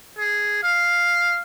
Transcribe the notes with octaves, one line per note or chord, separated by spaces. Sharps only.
G#4
F5